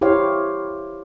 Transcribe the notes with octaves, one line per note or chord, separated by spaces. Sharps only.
E4 G4 C5 C#5 F5